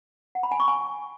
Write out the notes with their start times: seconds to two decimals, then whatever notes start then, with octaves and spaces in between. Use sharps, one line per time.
0.35 F#5
0.43 B5
0.52 G#5
0.60 C#6
0.68 G#5